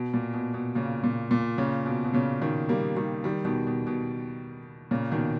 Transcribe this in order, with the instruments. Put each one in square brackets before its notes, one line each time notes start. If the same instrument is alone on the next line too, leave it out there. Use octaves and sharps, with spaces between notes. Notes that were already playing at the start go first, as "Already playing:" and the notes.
Already playing: [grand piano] B2
A#2
B2
B2
A#2 C#3
A#2
A#2
A#2 C#3
B2
B2
A#2 C#3
B2 D#3
G3 A#3
D#3 G3
D#3 G3
B2 D#3
B2
B2
A#2 C#3
B2 D#3